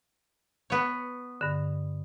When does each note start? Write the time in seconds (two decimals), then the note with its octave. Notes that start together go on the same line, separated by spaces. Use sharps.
0.70 B3 C#5
1.41 G2 D3